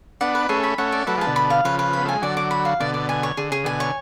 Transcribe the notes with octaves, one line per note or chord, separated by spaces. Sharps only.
B3 D4 F#5
B4
A3 C#4 G#4
B5
A3 C#4 F#5
D5
F#3 A3 B4
F3 G#3
A5
B2 D3
B5
F5
C#3 F3 B4
B4
B3 B5
A3 G#5
G#3
D3 F#3 D5
D6
B5
F5
B2 D3 D5
D5
G#5
C#5
D3 G#4
C#3 G#4
B2 D3 G#5
C#5